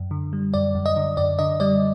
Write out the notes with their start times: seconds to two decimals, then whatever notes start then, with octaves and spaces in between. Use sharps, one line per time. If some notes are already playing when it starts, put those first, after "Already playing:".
Already playing: F#2
0.11 D3
0.33 G3
0.54 F#2 D5
0.75 F#2
0.86 D#5
0.96 D3
1.17 F#2 D5
1.39 D3 D#5
1.60 G3 D5